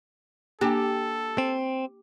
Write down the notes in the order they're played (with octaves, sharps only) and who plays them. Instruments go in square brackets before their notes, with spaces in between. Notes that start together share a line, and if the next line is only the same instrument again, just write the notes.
[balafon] A#3 D4 G#5 [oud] G4 [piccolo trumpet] A4
[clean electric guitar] C4